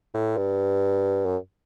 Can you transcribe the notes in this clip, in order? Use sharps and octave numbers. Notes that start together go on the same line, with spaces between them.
A2
G2
F#2